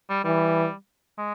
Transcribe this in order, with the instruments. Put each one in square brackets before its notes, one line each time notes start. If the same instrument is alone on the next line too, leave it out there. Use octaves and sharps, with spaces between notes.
[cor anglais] G3
[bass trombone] E3 [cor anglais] G3
[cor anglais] G#3